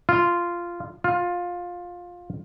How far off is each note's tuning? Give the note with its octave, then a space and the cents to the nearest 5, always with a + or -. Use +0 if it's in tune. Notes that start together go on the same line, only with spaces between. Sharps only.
F4 -10
F4 +15